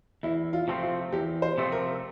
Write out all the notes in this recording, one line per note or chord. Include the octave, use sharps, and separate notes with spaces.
E2 E4
F4
C3 F3 A3 C4
F4
E2 G4
C5
C3 F3 A3 C4
A#4